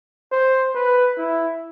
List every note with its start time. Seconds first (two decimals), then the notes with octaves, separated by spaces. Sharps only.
0.32 C5
0.75 B4
1.18 E4